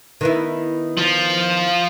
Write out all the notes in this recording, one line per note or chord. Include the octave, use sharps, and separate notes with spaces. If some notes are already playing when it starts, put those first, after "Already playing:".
D#3 B3 E4
F3 F4